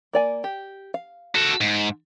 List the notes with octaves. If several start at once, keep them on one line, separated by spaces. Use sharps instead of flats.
A#3 D5 G#5
G4
F5
F#4 A4
G#2